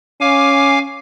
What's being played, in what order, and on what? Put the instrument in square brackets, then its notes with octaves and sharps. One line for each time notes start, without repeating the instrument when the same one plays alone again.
[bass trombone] C#4 [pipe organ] F5 G#5 D6